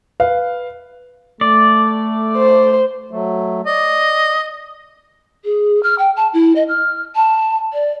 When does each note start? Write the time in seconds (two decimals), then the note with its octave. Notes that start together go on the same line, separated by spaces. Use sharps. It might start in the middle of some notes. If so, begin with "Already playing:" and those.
0.20 B4 F5
1.41 A3 D5
2.37 C5
3.11 F#3 A3
3.66 D5 D#5
5.44 G#4
5.83 F6
5.99 G5
6.17 A5
6.33 E4
6.56 D#5
6.68 F6
7.15 A5
7.73 D5